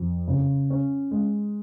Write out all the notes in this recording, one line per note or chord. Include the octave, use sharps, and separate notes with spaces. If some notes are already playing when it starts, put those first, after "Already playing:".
Already playing: F2
C#3
C#4
G#3